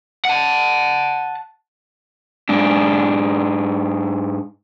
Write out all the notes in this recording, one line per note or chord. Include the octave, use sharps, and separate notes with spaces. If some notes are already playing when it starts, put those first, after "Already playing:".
F#5 A5
G#2 D4